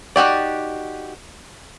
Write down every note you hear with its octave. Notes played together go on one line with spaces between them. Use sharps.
D#4 F#4 G4 D5